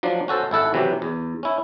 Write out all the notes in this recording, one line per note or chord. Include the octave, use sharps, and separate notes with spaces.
F3 F#3 D4
C#4 F#4 A4 C5
G#1 E4 A4 F#5
C3 E3 F#3 F#4 G4
E2
C#4 E4